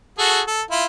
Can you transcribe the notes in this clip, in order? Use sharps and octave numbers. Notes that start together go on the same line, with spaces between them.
F#4 G#4 A4
A4
E4 F4